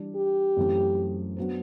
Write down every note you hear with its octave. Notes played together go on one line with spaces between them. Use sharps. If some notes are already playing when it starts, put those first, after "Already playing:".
Already playing: E3 G3 D4
G4
F#2 E3 A3 C4
F#3 B3 D4 F#4 C5